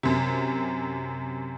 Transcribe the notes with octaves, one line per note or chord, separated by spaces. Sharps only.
F#2 C3